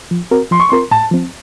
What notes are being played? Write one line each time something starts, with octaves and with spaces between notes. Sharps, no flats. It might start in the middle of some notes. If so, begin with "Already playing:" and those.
F3
C4 F#4 A#4
F3 C6
C#6
C4 F4 A#4 C6
A2 A5
F3 C4